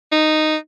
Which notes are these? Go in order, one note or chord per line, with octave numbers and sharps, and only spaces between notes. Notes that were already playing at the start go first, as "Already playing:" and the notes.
D#4